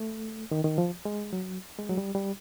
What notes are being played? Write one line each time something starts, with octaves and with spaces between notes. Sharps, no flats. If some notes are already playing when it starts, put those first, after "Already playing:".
Already playing: A3
D#3
D#3
F3
G#3
F#3
G#3
F#3
G3
G3